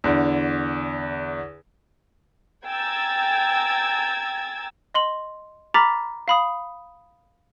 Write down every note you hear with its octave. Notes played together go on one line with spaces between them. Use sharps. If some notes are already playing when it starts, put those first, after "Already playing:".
E2 D3
G5 G#5 A#5 E6 G#6 A6
D#5 C6 F#7
A#5 B5 D6 F6 A6 B6
F5 B5 D#6